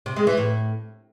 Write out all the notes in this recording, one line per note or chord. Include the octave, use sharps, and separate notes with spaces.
C3
G#3
E3
A2